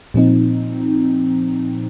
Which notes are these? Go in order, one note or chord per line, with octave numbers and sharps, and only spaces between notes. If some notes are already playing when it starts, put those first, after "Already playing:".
A#2 F3 C4 D#4